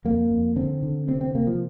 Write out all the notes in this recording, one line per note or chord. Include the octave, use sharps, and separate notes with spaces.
F2 A#3
F2
D3 C4
D3
C3 C4
C4
C3 A#3
F3